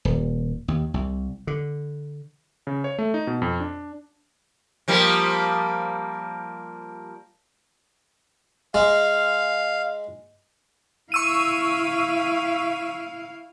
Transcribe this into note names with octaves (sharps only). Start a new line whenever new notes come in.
D#1
D#2
C2
D3
C#3
C#5
A3
D#4
B2
F2
D4
F3 G3 A#3
G#3 F5
E4 F5 C#6 E6 D#7